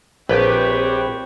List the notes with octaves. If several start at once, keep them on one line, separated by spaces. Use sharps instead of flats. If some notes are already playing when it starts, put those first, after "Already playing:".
A#1 C4 G4 B4 C#5